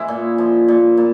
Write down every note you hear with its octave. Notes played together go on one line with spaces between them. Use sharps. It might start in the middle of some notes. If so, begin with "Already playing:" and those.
Already playing: E3 G#3 C#4 E4
A#2
F3
A#2
A#2